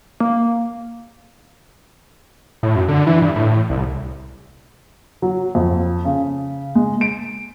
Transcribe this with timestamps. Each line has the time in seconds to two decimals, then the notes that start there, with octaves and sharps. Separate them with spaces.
0.20 A#3
2.63 A2
2.76 F#2
2.88 D3
3.07 E3
3.22 G2
3.36 A2
3.70 C2
5.22 F#3
5.55 F2
6.05 C#3
6.75 G#3
7.01 D7